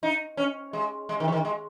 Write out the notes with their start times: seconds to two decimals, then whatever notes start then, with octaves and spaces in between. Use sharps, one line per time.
0.03 D#4
0.37 C#4
0.73 G#3
1.09 G#3
1.20 D#3
1.28 F3
1.32 D#3
1.45 G#3